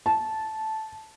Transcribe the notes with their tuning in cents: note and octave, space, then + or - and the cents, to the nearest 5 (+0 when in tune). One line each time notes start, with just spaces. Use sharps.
A5 -10